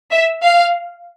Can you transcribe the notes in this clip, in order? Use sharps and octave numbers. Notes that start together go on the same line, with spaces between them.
E5
F5